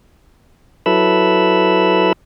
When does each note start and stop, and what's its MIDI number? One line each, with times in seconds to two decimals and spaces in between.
0.86 2.13 54
0.86 2.13 64
0.86 2.13 69
0.86 2.13 71
0.86 2.13 83
0.86 2.13 88